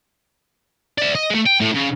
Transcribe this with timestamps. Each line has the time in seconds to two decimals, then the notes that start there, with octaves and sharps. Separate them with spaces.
0.98 D5 E5
1.15 D#5
1.30 G#3 A3
1.46 G5
1.60 A2
1.74 C#3